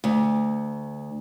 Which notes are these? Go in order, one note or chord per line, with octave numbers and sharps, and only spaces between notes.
D2